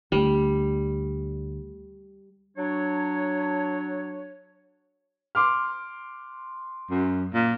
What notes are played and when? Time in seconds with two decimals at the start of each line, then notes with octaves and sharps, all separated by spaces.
0.12 D2 G3
2.57 F#3 D4 C#5
5.35 C6 D6 F6
6.90 F#2
7.33 A#2